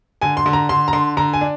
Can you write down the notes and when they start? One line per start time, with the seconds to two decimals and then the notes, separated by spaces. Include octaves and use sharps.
0.21 D3 G#5
0.37 C6
0.46 D3
0.53 A#5
0.69 D3 C6
0.88 A#5
0.93 D3 C6
1.17 D3 A#5
1.33 G#5
1.41 D4